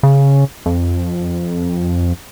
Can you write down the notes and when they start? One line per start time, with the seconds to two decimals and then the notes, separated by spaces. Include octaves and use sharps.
0.03 C#3
0.66 F2